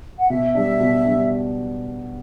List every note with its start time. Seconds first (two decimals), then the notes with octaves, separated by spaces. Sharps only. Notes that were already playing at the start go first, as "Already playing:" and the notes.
0.19 F#5
0.30 B2 E5
0.55 G3 D4 E5
0.80 B2
1.05 G3 D4